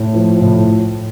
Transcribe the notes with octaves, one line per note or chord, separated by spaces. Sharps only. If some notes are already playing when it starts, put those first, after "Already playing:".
Already playing: A2
F3
A2